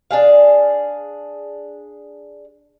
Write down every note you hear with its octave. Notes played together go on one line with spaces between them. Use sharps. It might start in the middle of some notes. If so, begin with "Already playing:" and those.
D4 G#4 F5